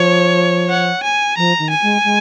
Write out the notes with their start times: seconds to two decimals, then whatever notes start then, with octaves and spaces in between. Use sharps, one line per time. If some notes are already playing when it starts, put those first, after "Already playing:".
Already playing: F3 C#5
0.69 F#5
1.03 G#5
1.37 F3 A#5
1.59 D#3
1.70 G#5
1.82 G#3
2.04 G#3